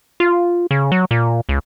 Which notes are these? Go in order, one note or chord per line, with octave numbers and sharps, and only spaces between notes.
F4
C#3
F#3
A#2
C#2